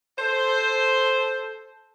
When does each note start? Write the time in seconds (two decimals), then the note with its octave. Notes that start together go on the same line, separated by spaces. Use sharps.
0.19 A4 C5